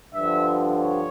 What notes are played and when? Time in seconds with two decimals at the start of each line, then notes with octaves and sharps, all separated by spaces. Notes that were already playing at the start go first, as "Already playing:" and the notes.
0.13 G2 D3 F3 E5
0.77 C#5